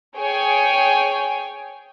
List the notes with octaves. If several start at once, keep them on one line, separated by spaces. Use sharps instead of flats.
G#4 C#5 G5 G#5